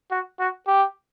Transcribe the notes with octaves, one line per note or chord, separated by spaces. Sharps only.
F#4
F#4
G4